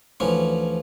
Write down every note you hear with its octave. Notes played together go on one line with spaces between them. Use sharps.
D2 E3 F3 C#4